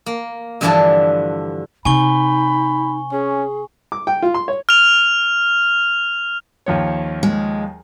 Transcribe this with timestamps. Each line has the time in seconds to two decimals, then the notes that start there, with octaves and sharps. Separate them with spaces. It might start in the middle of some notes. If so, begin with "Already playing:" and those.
0.06 A#3
0.61 G2 D3 E3 F3 D4 A5
1.85 C3 D#4 G#5 B5 C#6 G7
3.12 C#4 G#4
3.92 D6
4.07 G5
4.22 F4
4.34 C6
4.48 C#5
4.69 F6 F7
6.66 D#2 F3 C#5
7.23 G#3